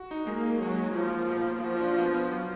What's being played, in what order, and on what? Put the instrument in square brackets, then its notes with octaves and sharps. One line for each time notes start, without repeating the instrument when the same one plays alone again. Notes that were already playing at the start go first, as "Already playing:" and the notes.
Already playing: [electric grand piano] F#4
D#4
[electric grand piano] G#3 [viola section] A#3
[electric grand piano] D#4
[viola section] F#3 [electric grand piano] F#4
[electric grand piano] D#4
[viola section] F3 [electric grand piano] A#3
[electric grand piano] A#3
B2
A#3
[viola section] F3 [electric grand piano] F#4
[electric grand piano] D4
B3
B3
F#3